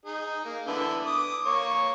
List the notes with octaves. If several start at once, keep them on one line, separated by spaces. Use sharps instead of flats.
D#4 G#4
A#3
D3 B3 E4
D6 D#6
A#3 C#5 C#6